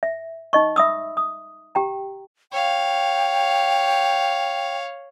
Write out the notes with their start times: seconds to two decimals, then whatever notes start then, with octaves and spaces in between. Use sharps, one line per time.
0.03 E5
0.53 D#4 D#5 C#6
0.76 E5 B5 D#6 E6
1.17 D#6
1.75 G4 G5 A#5
2.52 C#5 F5 G5